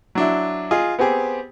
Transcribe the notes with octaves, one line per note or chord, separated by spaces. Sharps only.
F#3 D4 E4
F4 G#4 D#5
B3 C4 G4 G#4